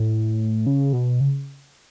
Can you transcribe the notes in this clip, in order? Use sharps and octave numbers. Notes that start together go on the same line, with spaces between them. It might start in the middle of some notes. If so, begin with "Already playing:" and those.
Already playing: A2
C#3
B2
C#3